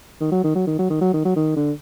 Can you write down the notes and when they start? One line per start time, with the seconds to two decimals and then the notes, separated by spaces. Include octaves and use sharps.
0.20 D#3
0.32 F#3
0.44 D#3
0.55 F#3
0.67 D#3
0.79 F#3
0.90 D#3
1.01 F#3
1.13 D#3
1.25 F#3
1.36 D#3
1.56 D3